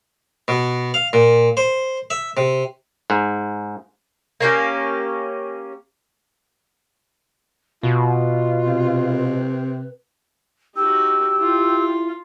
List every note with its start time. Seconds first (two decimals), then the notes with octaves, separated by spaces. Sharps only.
0.48 B2
0.94 F5
1.13 A#2
1.57 C5
2.10 E5
2.37 C3
3.10 G#2
4.41 A#3 C#4 G4
7.83 B2 F4 B4
8.66 C3
10.76 D#4 F#4 G4 E6
11.40 E4 F4